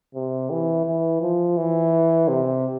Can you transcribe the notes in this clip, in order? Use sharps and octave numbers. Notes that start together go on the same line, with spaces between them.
C3
E3
E3
F3
E3
C3